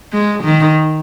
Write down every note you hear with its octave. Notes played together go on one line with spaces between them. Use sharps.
G#3
D#3